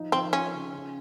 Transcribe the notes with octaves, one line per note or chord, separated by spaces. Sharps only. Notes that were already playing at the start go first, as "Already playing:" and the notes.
Already playing: F3 D#4
F3 C4
C#4 F4
C#3
C#3